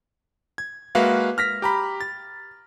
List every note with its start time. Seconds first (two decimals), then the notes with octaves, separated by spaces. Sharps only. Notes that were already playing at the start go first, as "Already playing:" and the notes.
0.58 G#6
0.95 G#3 A#3 F#4 B4 E5 F5
1.38 F6 A#6 B6
1.62 G4 A#5 B5
2.01 A6